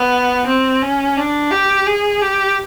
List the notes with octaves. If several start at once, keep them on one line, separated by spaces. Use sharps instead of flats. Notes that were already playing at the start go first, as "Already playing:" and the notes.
Already playing: B3
C4
C#4
D4
G4
G#4
G4